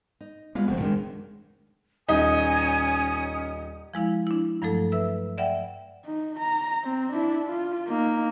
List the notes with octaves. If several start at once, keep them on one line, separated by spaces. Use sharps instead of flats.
D#4
G3 G#3 A#3 B3 F4
F1 F3 A3 C4 F#4
F#2 D#3 G#3 D4
D#1 C#4 D#4 D#5 G#5 D#6
F3 G#3 E4 F5
D4 E4
G2 F3 F#3 A3 A4
B4 E5 E6
D5 E5 F#5 G5
D#4
A#5
C4
D4 E4
F4
A#3 D#4